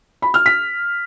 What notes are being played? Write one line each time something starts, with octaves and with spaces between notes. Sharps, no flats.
B5
F6
B6